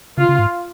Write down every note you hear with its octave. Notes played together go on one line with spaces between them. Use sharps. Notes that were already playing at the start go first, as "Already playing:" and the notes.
C#3 F4
C#3
G#2